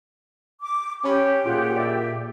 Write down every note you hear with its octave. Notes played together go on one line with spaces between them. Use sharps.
D6
C#4 G4 G#5 B5
A#2 F4 G#4 F#5
D5 E5